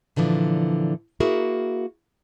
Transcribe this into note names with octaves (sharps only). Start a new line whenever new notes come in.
A#2 D3 E3 F3
A#3 E4 F#4 G#4 A#4